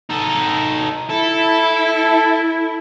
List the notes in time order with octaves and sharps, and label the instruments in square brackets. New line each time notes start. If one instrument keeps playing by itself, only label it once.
[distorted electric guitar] D#4 A4
[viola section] E4 [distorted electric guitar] A4